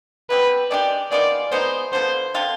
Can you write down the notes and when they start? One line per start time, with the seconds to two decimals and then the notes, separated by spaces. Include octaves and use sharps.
0.30 B2 G3 C4 B4
0.71 D#3 G#3 D4 G4 D5
1.11 D#3 B3 F4 G#4 D5
1.52 G#3 B3 D#4 C5
1.93 D3 F3 B3 C5
2.34 D3 F3 C4 F4